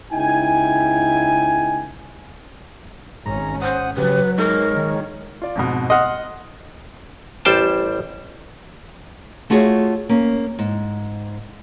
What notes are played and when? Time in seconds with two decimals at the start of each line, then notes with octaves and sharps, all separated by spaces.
0.12 C#2 D#4 E4 G5 G#5
3.26 G#1 G#2 C#4 A#5
3.62 C5 F#5 D#6
3.97 C#3 F#3 G4 B4
4.38 G#3 D#4 A#4 C#5
4.71 D#3
5.42 F4 D5
5.56 F2 G#2 B2
5.90 D#5 F#5 C6 F6
7.45 A1 G3 C5 G5 A5
9.50 A3 F4 F#4 G#4 C#5 E5
10.09 A#3 C#4
10.59 G#2